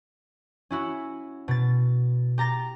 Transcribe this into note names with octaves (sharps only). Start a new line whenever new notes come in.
C#4 E4 F#4
B2 A6
G4 A#5 A6 A#6